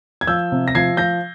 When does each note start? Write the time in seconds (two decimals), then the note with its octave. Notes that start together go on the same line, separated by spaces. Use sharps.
0.21 G#6
0.27 F3 E6 G6
0.52 C3
0.68 A#6
0.75 F3 G#6 C7
0.97 F3 G6 A#6